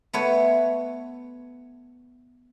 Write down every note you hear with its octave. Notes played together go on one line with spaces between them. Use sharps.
A3 B3 B4 C#5